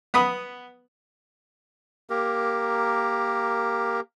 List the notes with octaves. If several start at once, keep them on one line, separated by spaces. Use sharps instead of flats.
B3 B5 D#6
A#3 G4 A#4